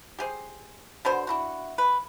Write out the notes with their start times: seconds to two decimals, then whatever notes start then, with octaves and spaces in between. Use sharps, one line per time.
0.19 G4 G#4 C5
1.05 B2 D3 C5
1.27 D4 E4 F#4
1.78 B4